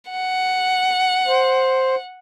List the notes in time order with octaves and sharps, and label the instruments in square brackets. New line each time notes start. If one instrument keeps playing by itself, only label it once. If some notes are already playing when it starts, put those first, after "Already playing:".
[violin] F#5
[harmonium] C5